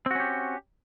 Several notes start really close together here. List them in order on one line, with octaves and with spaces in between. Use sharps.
C4 F#4 C#4 G4